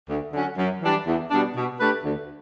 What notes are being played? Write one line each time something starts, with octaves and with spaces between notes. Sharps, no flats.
D2
D3 F#3 C#4 F#4
F#2
E3 G3 D4
E2
B2 G3 B3 D4
B2
A3 D4 G4 B4
D2